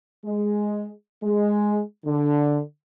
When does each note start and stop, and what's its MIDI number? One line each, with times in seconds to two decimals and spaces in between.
0.25 0.90 56
1.23 1.80 56
2.05 2.59 50